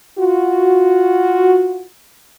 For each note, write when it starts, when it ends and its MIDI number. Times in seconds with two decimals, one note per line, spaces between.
0.19 1.84 65
0.19 1.84 66